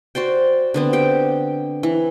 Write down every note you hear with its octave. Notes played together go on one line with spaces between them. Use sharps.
F#4 C5 D5 G5
D3 B3 C4
G4 G5
E3